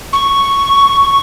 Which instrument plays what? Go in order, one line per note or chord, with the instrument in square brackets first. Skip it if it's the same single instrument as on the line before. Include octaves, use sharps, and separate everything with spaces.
[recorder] C#6